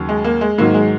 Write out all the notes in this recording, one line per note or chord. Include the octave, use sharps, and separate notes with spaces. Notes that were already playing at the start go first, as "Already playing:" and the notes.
Already playing: D#2 C#3 F#3
G#3
A#3
G#3
G#2 D#3 F#3 A#3
G#3